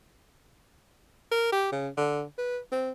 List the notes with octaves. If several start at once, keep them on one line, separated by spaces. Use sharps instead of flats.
A#4
G4
C#3
D3
B4
C4